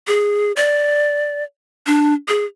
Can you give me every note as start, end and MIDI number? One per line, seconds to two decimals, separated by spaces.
0.07 0.52 68
0.56 1.43 74
1.87 2.14 62
2.28 2.45 68